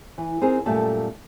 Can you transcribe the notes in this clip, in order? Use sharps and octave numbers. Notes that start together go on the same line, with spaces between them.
E3
C4 D#4 G#4 A#4
F#2 A#2 G3 A3 A4